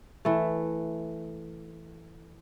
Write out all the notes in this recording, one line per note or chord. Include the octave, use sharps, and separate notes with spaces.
E3 A3